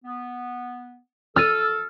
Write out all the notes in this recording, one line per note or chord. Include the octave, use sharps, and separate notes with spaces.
B3
A4 E6 F6 A6 D#7